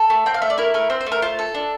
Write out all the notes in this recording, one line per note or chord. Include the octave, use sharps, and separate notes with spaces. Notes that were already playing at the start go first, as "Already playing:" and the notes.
Already playing: A4 A5
A3
C4 G5
F5
A3 E5
D5
E4 A#4
A3 A#4
C4 C5
C5
A3
A#4
F4 C5
A4
D4